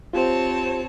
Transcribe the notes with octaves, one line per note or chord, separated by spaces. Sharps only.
C4 F4 G4 C5 C#5 A5